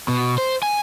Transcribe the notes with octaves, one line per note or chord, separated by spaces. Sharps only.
B2
C5
G#5